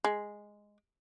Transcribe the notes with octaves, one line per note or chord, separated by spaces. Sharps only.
G#3